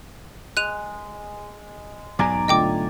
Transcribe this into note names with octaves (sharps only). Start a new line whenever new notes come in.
G#3 F#6 D#7 F7
B1 G#2 B2 D5 G#5 A#5
D3 A3 F4 D#5 G5 D6